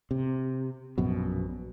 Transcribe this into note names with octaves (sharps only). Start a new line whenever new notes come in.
C3
A#1 F#2 B2